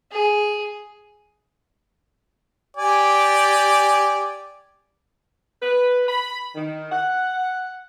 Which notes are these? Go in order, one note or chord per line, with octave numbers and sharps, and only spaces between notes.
G#4
G4 D5 G#5
B4
B5
D#3
F#5